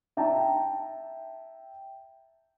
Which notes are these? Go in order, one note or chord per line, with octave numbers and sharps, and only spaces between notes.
E5 G5 A5 A#5